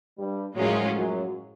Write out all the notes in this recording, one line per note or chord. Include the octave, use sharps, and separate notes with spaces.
G2 G3
F#2 A2 F3 F#3 G#3 C#4 F4
F#2 F#3